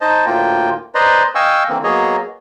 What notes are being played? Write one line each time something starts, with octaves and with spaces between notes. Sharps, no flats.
D#4 C5 D#5 A5
D2 A2 A#3 F4 G5
B4 C5 D5 D#5 A#5 C6
D#5 F5 G5 G#5 C#6 E6
D3 E3 A#3 C4
F#3 A#3 B3 G#4 C#5 D#5